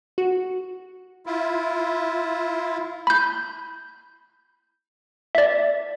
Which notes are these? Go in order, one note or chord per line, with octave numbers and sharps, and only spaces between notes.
F#4
E4 F4
B5 G6
D5 E5